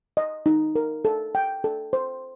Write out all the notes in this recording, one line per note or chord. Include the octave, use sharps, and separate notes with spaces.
D#5
D#4
A#4
A4
G5
A4
C5